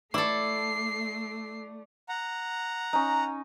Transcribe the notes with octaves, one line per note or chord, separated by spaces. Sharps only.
A3 E4 A4 D5 C7
F#5 A#5
C#4 D#4